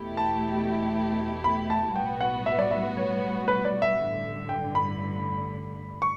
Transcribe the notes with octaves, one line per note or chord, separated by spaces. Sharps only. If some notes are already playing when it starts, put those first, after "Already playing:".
Already playing: E2 B2 A3 E4 G4
A5
B5
A5
B1 A2 G3 B3 F#4 G5
F#5
E5
D5
E5
C#5
B4
D5
E5
A1 G2 D3
G5
B5
C#6